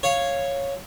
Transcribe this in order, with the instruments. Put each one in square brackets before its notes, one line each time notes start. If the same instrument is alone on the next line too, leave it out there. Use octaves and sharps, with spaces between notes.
[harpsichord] C#5 F5